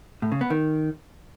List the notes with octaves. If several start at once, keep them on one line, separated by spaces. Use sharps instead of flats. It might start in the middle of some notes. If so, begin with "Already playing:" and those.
A2
C#3
B3
D#3